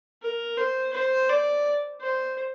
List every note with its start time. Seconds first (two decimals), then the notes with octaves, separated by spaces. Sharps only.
0.22 A#4
0.57 C5
0.93 C5
1.30 D5
2.01 C5